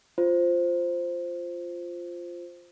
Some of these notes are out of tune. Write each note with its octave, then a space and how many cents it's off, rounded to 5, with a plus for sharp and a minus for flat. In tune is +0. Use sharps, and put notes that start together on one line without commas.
F4 +0 C5 +0